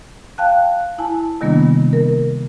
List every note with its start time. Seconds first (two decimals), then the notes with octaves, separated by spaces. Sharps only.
0.38 F5 G5 A5 F#6
0.99 E4 G#5 A5
1.41 C3 D#3 G3 A#3 B3 D4
1.93 A#4